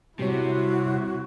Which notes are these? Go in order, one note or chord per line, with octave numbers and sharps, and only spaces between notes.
C3 G3 E4 F#4 C#5